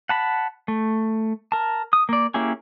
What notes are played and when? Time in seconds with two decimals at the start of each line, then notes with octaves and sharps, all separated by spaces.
0.09 F#5 A5 B5
0.68 A3
1.52 A#4 A5
1.93 D#6
2.09 A#3 D5
2.34 A#3 C#4 E4 G4 G#4